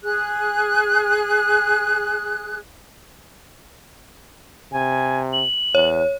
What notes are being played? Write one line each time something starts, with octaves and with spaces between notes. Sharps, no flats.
G#4 F#6
C3 G#5
F#7
E2 C#5